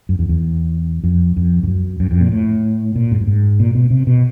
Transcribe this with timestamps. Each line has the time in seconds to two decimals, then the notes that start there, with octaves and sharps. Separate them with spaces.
0.09 F#2
0.19 E2
0.29 E2
1.04 F2
1.37 F2
1.63 F2
1.68 F#2
2.00 F#2
2.11 F2
2.21 A#2
2.32 A2
2.96 A#2
3.12 G#2
3.20 G2
3.27 G#2
3.60 A#2
3.75 B2
3.90 C3
4.07 B2